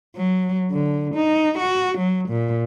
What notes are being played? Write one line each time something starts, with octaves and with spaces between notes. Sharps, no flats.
F#3
D3
D#4
F#4
F#3
A#2